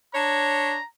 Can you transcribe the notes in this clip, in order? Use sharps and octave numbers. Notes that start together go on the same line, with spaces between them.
D4 C#5 A#5